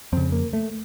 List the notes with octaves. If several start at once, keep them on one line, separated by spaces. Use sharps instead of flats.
F2 C#3 C4
A#3
A3